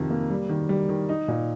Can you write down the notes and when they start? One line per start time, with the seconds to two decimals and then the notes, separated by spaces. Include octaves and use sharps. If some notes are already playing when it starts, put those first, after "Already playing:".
Already playing: F2 C3 D#3
0.10 A#3
0.30 G3
0.49 D#3
0.69 G3
0.89 D#3
1.09 D#4
1.28 A#2